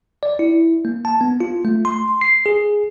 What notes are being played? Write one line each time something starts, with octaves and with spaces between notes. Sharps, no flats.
D5
E4
A#3
A5
B3
F4
A3
C6
C7
G#4